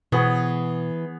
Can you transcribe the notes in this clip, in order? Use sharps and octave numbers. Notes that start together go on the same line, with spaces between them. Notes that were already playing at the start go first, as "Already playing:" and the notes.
B2 E3 B3 G#4 C#5